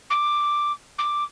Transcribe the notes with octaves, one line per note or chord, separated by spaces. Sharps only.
D6
D6